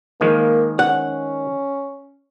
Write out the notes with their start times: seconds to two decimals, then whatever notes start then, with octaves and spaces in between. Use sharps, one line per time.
0.21 D#3 F3 G#3 A#3
0.79 C#4 F#5